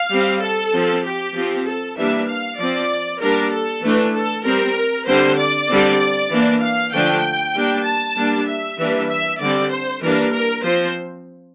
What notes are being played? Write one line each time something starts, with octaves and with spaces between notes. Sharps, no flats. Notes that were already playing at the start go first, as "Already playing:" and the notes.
Already playing: F5
G3 C4
A4
F3 C4
G4
F3 C4
A4
E3 G3 A#3 D4 E5
F5
F3 C4 D5
G3 A#3 D4 A#4
A4
E3 A3 D4
A4
G3 C4 A#4
D3 G3 C4 C5
D5
D3 G3 C4
E3 A#3 D4
F5
D3 F3 A3 D4 G5
G3 A#3 D4
A5
G3 A#3 D4
E5
E3 G3 A#3 D4
E5
D3 G3 C4 D5
C5
E3 G3 A#3 D4 A#4
A#4
F3 C4 C5